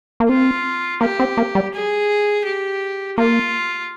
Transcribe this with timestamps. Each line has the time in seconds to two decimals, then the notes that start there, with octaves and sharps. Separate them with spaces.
0.20 A#3
0.29 C4 F4
1.01 A#3 G4
1.20 C4
1.37 A#3
1.55 G3
1.74 G#4
2.45 G4
3.18 A#3 F4